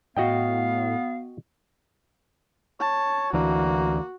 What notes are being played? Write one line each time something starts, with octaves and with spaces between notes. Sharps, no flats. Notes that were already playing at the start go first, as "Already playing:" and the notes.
A2 B3 F#4 D#5 F5 G5
C#5 A5
D2 E3 A#3 D4 F#4